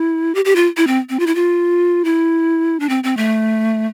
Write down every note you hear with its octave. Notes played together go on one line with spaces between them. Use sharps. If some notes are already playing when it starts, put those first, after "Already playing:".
Already playing: E4
G4
G4
F4
E4
C4
C4
F4
E4
F4
E4
D4
C4
C4
A3